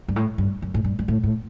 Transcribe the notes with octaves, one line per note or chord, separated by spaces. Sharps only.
G2
A2
G2
F#2
A2
G2
G2
A2
A2